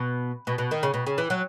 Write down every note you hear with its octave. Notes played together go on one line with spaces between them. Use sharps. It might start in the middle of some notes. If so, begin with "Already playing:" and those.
Already playing: B2
B2
B2
D#3
C#3
B2
C#3
E3
F#3